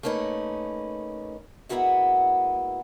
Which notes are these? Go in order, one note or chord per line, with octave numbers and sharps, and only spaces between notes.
A3 A#3 C#4 D#4 B4
G#3 A#3 B3 E4 F#4 E5